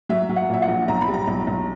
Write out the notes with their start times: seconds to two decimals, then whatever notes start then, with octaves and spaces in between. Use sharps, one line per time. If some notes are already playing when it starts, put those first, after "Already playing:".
0.09 F#3 E5
0.29 F#3
0.36 F#5
0.49 A#2 E5
0.62 F#5
0.68 A#1
0.88 B1 A#5
1.01 B5
1.08 G3
1.14 A#5
1.27 B1
1.47 B1